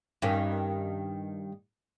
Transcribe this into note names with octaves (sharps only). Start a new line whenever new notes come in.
G2 D#3 C#4